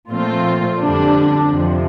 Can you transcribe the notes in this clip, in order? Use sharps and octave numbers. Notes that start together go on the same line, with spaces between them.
A#2 F3 A3 C4 F4
F2 D3 G3 D4
F2 C3 F3